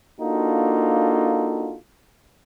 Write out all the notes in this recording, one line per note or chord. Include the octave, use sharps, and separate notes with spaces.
A#3 D4 D#4 F4 F#4 A4